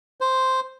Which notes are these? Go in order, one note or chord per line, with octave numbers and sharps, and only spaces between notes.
C5